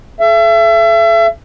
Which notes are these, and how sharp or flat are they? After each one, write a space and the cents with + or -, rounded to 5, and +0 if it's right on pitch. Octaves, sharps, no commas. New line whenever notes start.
A4 -40 E5 +35